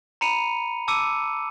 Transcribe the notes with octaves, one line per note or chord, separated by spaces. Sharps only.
A#5 B5 C#7 D#7 F7
A5 D6 E6 C#7 D#7